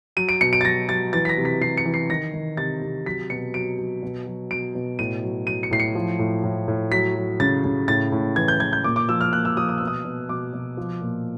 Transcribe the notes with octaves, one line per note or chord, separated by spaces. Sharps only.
F#3 D#7
D7
B2 C#7
D7
A6
F#3 A#6
F#3 A6
E3 A6
B6
A#6
C3
B6
C3 C7
C#7
E3
C7
D#3 A#6
D#3
C3 A6
C3
F#3 B6
B2 C#7
F#3 D7
F#3
B2
F#3
B2 D7
B2
A2 D#7
F#3
F#3 D#7
C#7
A2 C7
C#7
F3
A2
A2
A2
F#3 B6
F#3
C#3 A6
C#3
A2 A6
A2
E3 G#6
G6
E3 G#6
G6
A#2 D6
D6
F3 E6
F6
A#2 F#6
E6
F3 D#6
D#6
B2 E6
D#6
B2
B2 D6
B2
F3
A#2